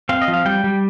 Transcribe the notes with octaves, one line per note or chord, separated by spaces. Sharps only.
C4 F5
D#5
F3
F5
G3 G5
G3